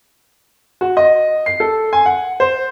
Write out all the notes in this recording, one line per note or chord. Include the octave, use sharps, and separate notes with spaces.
F#4
D#5
C7
A4
G#5
F#5
C5